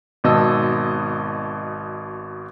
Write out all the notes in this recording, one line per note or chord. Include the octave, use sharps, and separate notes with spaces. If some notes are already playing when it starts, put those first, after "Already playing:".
G#1 B2 D#5 A5 E6